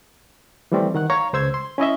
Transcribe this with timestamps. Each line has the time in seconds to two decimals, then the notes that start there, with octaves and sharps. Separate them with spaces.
0.72 E3 F3 G3 A3 C4
0.95 D#3 F#5 F#6
1.10 C#5 F5 A#5 C#6
1.33 C#2 C5 E6 G#6
1.54 C6
1.78 C#4 E4 D#5 E5